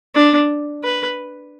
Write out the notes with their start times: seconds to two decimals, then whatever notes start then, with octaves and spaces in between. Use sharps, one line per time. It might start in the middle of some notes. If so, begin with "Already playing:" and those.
0.15 D4
0.84 B4